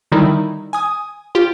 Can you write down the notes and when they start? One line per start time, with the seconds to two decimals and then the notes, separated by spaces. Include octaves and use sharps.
0.12 D3 D#3 G3 D#4 E4
0.73 G#5 D#6
1.35 F4 G4